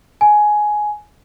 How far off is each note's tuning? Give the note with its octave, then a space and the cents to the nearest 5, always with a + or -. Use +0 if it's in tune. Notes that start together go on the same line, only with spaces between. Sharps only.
G#5 +15